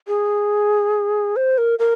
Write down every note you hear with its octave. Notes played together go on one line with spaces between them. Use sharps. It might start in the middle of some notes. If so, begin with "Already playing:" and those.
G#4
C5
A#4
A#4